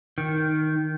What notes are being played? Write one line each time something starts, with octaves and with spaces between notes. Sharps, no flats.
D#3